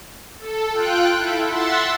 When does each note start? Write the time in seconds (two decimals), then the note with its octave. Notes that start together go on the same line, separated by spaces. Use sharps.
0.39 A4
0.71 F4 G5 F#6 D7
1.15 E4 A4
1.47 E5 F#5 C6 E6 A6